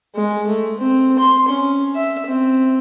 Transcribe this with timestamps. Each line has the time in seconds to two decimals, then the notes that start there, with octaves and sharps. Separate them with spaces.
0.15 G#3
0.48 A3
0.78 C4
1.19 C6
1.48 C#4
1.95 E5
2.27 C4